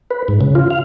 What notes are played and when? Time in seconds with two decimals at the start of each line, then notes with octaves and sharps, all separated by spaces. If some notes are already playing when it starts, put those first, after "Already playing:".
0.11 B4
0.28 G#2
0.41 C#3
0.55 F4
0.71 F5